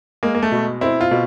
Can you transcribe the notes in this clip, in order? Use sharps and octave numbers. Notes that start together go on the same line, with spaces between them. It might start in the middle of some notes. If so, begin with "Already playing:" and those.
G#3 A#3
A#3
A3
B2
C4 E4
F4
B2